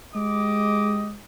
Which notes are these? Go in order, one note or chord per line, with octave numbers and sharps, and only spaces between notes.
G#3 G4 D#5 D6